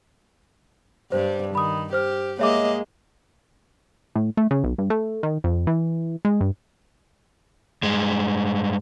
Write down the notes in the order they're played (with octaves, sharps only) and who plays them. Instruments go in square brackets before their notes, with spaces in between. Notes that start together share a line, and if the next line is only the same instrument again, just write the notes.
[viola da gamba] G2 G3 [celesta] C5
[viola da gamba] D#3 [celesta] B5 D#6
[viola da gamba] G4 [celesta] C5 F6
[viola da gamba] G#3 A#3 D#5 [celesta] C#5 E5 D6
[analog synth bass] A2
A3
C#3
B1
G2
A3
D#3
F2
E3
G#3
G2
[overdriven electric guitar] G2 G#3